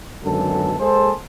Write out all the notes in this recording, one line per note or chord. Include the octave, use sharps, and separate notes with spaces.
G#1 F#2 B2 D3 A3 A4
G#3 A#3 G#4 A4 C5